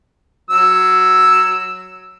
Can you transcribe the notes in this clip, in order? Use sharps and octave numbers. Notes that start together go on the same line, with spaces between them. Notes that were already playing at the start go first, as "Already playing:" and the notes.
F#3 E6